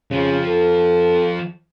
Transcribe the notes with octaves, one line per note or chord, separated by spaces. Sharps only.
F2 C#3 F3
A4